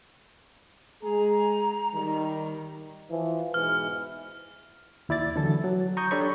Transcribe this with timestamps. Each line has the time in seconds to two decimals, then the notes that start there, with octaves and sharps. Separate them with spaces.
1.03 G#3 G#4 A#5
1.94 D#3 G3
3.10 E3 F3
3.54 G#2 B2 E3 F6
5.09 D#2 E4 D5 A6
5.36 D3 E3 F#3 A4
5.64 F#3
5.97 A#5 C#6 D#6 G6
6.11 D4 G4 A4 C#5 B5 C#6